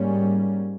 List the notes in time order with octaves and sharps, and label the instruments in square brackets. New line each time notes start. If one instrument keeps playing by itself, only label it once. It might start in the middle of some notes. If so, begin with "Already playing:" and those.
Already playing: [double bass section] G#2 G3 A#3 C#4